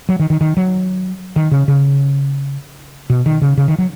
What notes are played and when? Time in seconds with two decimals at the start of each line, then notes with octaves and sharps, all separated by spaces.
0.09 F#3
0.20 D#3
0.30 D#3
0.41 D#3
0.57 F#3
1.36 D#3
1.51 C#3
1.68 C#3
3.10 B2
3.26 D#3
3.42 C#3
3.58 C#3
3.68 D#3
3.78 F#3